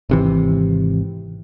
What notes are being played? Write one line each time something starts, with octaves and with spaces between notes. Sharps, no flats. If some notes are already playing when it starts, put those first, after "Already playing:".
G#1 C3 E3